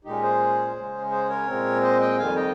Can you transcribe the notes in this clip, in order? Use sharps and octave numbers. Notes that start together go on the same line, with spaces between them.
A#2 G#3 C#4 D#4 G4
G#4 C5
C#3 G#3 C#4
G#4 C5
A#4 C#5
A#2 G#3 C4
C5 D#5
D#5 G5
F2 D#3 G3 F5 G#5
D#5 G5